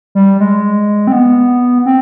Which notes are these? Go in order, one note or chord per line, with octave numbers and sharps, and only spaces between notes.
G3
G#3
C4
B3
C4